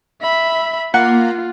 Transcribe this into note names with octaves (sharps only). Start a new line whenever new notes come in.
E5 B5
A#3 F4 F#5